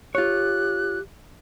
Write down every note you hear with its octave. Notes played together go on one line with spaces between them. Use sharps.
F4 G4 C#5 F#6